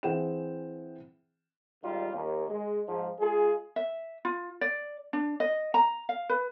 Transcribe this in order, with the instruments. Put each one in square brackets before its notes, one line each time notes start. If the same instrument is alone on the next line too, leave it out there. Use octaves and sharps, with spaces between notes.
[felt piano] E3 C4 G#4 F#5 G5 E7
[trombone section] G#1 G3 D#4 F4
D#2
G#3
G#2 F3
G#3 F4 G#4
[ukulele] E5
F4
D5
D4
D#5
A#5
F5
B4